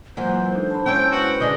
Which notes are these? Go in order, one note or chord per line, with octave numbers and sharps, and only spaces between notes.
E3 F#3 G#3 A#3 F4 C5 F#5
D4 D#4 A4
A5 B5
G#3 C#4 E4 C#5 G5 E6
F#4 B4
D3 G#3 D4 D#5